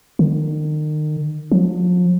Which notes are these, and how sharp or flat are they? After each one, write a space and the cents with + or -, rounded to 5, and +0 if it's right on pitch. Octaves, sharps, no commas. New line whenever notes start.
D#3 -35
F3 +40